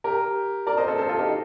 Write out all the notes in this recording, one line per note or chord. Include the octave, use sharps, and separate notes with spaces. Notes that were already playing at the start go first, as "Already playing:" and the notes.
G4 A#4
A#4 D5
C5 D#5
A4 C5
A4 C5
F4 A4
D#4 G4